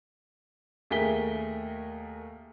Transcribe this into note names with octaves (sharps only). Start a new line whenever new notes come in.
D#2 A3 G#4 A#4 B6 G7